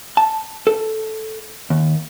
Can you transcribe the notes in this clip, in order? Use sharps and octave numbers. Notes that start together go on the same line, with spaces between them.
A5
A4
D#2